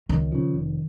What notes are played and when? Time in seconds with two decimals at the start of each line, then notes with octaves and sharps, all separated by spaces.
0.09 C#2 D#3
0.32 C#3 F3
0.54 F1